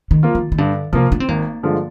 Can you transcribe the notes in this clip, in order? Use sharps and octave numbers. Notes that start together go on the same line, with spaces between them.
D#3
F3 A#3 F4
D#3
D#3
G2 D3
C3 F3 A#3 F4
D4
C4
G#1 A#3
G2 D3 F3 G#3